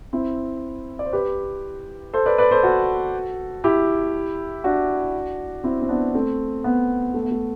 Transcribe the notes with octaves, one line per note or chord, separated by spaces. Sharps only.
C4 E4
D5
C5
G4 B4
A4 C5
B4 D5
B4 D5
A4 C5
F#4 A4
E4 G4
D4 F#4
C4 E4
C4
B3 D4
A3 C4
B3
A3
B3
A3